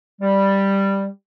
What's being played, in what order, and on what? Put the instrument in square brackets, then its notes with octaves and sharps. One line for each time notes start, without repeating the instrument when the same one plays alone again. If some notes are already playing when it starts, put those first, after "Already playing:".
[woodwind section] G3